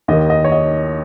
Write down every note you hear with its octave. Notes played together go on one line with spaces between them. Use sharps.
D#2 D#3 D#5
D#5
C#5
D#5